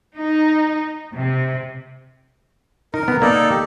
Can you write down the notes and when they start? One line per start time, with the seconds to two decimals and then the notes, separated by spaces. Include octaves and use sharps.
0.17 D#4
1.13 C3
2.94 D#4 A#4
3.08 B3
3.22 A#3 D#4 A4 D5
3.50 G4